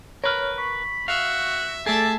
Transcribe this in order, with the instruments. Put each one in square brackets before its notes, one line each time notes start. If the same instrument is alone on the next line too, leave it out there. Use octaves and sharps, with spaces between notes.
[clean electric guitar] A#4 B4 [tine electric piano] C#5 F6
[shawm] B5 [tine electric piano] C#6
[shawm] F#4 [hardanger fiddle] E5 [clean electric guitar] F5
[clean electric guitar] A3 G#4 [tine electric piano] A4 A6 [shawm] D5 [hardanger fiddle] E5 A5